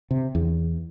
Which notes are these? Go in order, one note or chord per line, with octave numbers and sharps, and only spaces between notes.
C3
E2